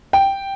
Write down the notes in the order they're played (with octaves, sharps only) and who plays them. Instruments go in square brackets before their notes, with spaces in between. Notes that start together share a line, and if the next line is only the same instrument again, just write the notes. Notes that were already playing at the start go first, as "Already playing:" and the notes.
[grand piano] G5